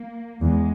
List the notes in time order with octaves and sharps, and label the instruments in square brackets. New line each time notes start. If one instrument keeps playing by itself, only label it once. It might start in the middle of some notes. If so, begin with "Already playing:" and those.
Already playing: [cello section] A#3
[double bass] E2 [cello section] G#3